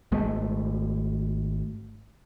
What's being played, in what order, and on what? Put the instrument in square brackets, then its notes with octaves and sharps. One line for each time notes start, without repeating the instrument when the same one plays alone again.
[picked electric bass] G#1 G#3 A3